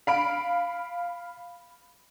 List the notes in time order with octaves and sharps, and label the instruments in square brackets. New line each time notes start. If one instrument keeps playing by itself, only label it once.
[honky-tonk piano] F5 B5 D7